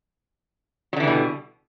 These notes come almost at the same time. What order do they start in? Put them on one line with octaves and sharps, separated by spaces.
F#3 D3 E3 G3 B2